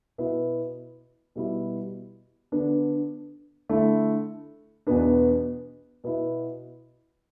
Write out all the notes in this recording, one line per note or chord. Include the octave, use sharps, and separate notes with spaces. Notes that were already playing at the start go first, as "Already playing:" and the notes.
B2 B3 E4
B2 G3 E4
D3 B3 D4
D3 A3 E4
E2 B2 B3 D4
B2 B3 E4